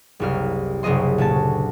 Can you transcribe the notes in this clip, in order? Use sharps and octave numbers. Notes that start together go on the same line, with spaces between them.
F#1 C2 F6
F#1 C2 C#3 D#5 C6
D2 A#2 C#4 A5